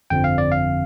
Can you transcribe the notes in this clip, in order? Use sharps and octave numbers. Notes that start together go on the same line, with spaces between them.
G1 F2 D3 F3 C4 G5
F5
D5
F5